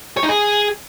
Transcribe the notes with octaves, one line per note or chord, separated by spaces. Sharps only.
C#5
D#4
G#4